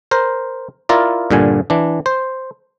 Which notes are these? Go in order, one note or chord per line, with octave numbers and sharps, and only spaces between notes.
A#4 C5
E4 F4 A#4 D5
G2 A#2 D3 G#5
E3 D4
C5